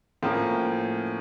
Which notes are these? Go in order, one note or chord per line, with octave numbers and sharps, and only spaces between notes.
A2 F3 A#3 C#4